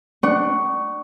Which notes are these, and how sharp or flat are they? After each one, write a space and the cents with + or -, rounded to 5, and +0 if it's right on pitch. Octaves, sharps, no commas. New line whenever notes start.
D4 +15 F#5 +45 C#6 +5